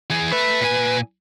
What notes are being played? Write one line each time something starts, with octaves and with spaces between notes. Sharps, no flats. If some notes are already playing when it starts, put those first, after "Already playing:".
E3 G#4
A4 B4 E5
A#2 G#5